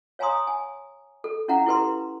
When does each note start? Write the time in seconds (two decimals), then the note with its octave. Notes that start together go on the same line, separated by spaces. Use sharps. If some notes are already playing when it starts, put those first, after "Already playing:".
0.19 C#5 F5 G#5 A#5 C6 D#6
0.47 G#5
1.24 A4
1.48 C#4 E4 F5 F#5 A#5
1.66 E4 G4 A4 B4 A#5 C6